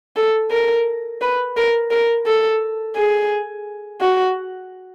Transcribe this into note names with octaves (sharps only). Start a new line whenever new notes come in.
A4
A#4
B4
A#4
A#4
A4
G#4
F#4